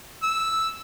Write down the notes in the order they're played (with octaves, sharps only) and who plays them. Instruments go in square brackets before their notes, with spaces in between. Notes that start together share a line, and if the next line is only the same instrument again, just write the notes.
[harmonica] E6